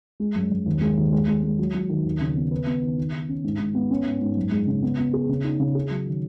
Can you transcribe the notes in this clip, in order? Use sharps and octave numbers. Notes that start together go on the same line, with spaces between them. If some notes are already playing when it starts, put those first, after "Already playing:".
G#3
F#2
F#2
D#2
G#3
D#2
G#3
G#3
G#3
F#3
F#3
D#3
D#2
C#3
B3
B4
B3
D#3
D#3
D#3
C#4
G#2
G#2
B3
C#4
G#2
G#2
F#2
G#3
C#3
B3
B3
G#4
C#3
D#4
C#3
G#4
F#3
D#3